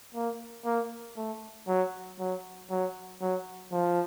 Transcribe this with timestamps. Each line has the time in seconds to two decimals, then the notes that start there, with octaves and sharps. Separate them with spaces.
0.15 A#3
0.65 A#3
1.16 A3
1.68 F#3
2.19 F#3
2.70 F#3
3.21 F#3
3.72 F3